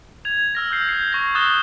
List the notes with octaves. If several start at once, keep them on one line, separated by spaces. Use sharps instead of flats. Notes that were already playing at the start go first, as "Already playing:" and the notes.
G#6 F7
E6 F6 A#6
E6 G6 C7
G6 C7
C#6 A#6
D#6 E6 F#6 A6 E7 G7